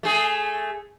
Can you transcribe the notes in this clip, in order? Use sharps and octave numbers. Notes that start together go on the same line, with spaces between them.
A3 G#4